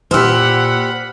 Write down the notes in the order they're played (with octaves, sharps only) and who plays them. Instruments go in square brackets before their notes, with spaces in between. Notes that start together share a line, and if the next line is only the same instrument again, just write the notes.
[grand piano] A#2 E6 F6 [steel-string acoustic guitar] G4 C5 [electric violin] F#5 B5